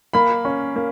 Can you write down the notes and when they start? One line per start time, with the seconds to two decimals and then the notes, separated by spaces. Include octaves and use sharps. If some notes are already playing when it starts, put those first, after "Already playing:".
0.13 A#3 B5
0.45 C#4
0.76 A#3